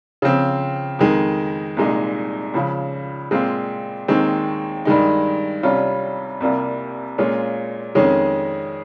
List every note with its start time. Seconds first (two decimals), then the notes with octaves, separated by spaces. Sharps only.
0.22 C#3 F3 C4
0.99 F2 D#3 G#3
1.77 C2 A#2 G#3 D#4
2.54 C#2 C#3 F3
3.31 A#2 G#3 C4 F4
4.08 D#2 D#3 G#3 C4 D#4
4.85 G2 D#3 G#3 D#4
5.63 C2 C3 G3 C#4 F4
6.41 C2 C3 G3 A#3 F4
7.18 A#2 G#3 C#4 F4
7.95 F2 D#3 G#3 C#4